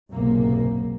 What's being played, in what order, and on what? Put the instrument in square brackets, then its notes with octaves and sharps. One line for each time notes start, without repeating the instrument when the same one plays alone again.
[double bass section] F#1 B1 G#2 C3 A#3